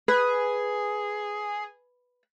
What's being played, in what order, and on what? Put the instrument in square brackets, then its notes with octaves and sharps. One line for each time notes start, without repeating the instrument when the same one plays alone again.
[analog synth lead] G#4 [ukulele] B4